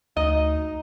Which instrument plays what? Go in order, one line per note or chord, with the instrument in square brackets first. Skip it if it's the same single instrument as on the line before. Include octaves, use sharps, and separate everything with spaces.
[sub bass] D2 [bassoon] D#4 [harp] D#5